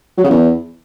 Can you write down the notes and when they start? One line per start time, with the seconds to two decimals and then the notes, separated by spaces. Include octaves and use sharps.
0.18 F#3
0.24 C#3
0.30 E2